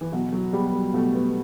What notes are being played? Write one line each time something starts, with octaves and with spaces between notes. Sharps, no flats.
E3
B2 F#3
F#3
F#3 G3 B3
G3
B2 A3
B3